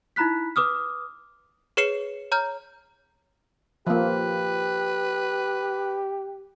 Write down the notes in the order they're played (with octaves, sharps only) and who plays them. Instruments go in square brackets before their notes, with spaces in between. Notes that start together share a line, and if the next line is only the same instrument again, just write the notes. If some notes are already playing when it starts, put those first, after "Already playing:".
[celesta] D#4 E4 A#5 B5 F#6 B6
B4 D6 D#6 F6
[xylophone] G#4 B4 C#5 C7 C#7 E7
C#5 A#5 F6 G6
[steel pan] F3 A#3 [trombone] G4 [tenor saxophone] B4